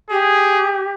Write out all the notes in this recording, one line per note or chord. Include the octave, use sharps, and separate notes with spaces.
G4 G#4